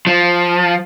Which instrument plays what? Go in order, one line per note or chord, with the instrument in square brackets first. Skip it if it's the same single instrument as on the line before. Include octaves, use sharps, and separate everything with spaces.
[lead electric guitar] F3